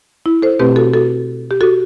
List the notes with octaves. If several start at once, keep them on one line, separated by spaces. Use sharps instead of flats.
E4
A4 C5
B2 A3 C4 G4 B4
F#4 A4
F#4 A4
G4
F#4 A4